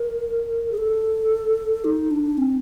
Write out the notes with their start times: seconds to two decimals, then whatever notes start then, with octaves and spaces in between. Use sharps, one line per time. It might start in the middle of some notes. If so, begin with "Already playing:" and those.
Already playing: A#4
0.72 G#4
0.78 A4
1.85 D#4
2.11 D4
2.38 C4